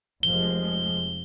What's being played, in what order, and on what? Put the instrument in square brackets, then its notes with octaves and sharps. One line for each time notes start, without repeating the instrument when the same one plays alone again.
[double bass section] F1 F3 G#3 [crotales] G7